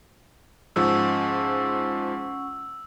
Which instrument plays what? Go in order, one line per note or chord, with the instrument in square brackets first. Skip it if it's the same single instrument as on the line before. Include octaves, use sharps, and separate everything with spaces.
[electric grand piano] G#2 F3 G#3 [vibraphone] C#4 F#5 C#6 [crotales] E6